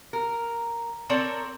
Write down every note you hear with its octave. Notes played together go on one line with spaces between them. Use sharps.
A#4
C4 A4 A#4 C#5 D5 A5